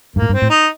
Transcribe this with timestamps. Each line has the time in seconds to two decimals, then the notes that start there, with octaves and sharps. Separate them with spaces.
0.16 G2 A#3
0.22 A2
0.29 G2
0.33 C4
0.42 A2
0.50 D#4